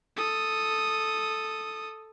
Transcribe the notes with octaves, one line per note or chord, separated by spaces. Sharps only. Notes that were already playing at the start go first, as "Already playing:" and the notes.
A4 D#6